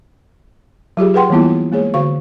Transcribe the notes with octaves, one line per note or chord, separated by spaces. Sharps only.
F#3 F4 G4 G#4
G#4 B4 F#5 G5 C6
E3 G3 A#3 B3 E4 F4
G#3 A#3 G#4 C#5
D3 F#4 F5 C#6